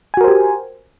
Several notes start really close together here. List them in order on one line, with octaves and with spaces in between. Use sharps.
G#5 F#4 A#4 C5 G4